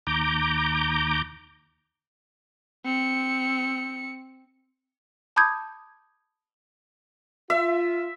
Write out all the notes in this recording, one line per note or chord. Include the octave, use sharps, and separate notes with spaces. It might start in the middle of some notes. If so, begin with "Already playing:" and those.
D#2 A#5 D6 G6
C4 C#7
A5 B5 D6 D#6 G6 G#6
F4 E5